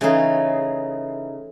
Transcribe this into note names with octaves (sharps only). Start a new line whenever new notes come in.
C#3 E3 A3 D#4 G#4